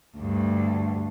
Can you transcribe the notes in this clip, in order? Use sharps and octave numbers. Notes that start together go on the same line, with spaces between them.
D2 G2